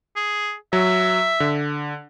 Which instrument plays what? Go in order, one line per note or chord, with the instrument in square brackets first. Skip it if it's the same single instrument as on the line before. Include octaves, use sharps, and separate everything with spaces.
[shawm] G#4
[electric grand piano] F#3 [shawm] E5
[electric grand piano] D3